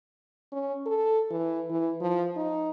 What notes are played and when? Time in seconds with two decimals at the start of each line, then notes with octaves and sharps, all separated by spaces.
0.52 C#4
0.86 A4
1.31 E3
1.70 E3
2.01 F3
2.36 D#4